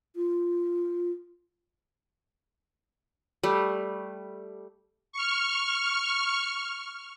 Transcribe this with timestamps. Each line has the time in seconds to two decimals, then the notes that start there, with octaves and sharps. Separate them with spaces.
0.16 F4
3.43 G3 A3
5.12 C#6 F6